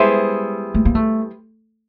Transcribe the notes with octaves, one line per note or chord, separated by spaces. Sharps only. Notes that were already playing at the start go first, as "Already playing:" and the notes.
Already playing: G3 G#3 B3 E4 G#4 C5
A3
A#3
A3